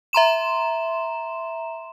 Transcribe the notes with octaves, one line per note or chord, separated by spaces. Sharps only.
E5 A#5 C6 E7